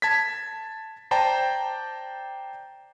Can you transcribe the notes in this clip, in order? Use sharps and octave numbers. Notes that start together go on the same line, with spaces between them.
A5 G#6 B6
C5 D5 G5 A5 A#5